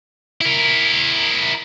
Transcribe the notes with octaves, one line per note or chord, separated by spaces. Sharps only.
E4 A#4